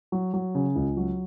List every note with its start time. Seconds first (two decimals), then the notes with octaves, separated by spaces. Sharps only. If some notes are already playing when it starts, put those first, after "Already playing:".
0.12 F#3
0.34 F#3
0.55 C#3
0.76 C#2
0.97 F#3